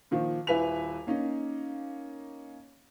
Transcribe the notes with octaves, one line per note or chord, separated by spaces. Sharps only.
A#2 D#3 F3
D#1 E4 B4 G#5 B6 F7
A#3 C#4 D#4